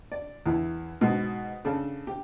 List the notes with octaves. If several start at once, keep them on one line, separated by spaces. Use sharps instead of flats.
D5
E2 E4
G#2 B2
C#3 D4 A4
G4